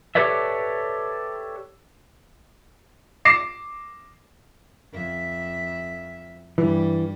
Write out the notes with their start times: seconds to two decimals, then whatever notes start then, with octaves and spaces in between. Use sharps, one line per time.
0.15 G4 A4 B4 C#5 D5 E5
3.25 D6 A#6 C7 E7
4.93 F2 E5
6.58 G2 E3 G3